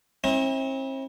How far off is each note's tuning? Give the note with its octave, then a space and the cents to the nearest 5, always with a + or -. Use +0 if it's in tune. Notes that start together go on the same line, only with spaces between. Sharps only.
C4 +40 E4 -30